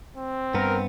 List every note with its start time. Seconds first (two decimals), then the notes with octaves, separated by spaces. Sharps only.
0.16 C4
0.54 G2 B3 A#4